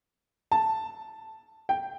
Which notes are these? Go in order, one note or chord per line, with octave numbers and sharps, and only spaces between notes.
A5
G5